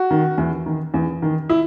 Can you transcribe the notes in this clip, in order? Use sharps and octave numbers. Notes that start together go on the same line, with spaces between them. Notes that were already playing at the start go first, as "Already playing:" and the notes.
Already playing: F#4
D#3
E2
D#3
E2
D#3
E4